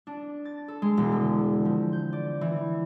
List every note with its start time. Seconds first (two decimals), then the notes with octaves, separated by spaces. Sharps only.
0.07 D4
0.45 A6
0.68 A4
0.82 G#3
0.97 E1
1.12 D3
1.65 F3
1.92 G6
2.13 D5
2.41 E3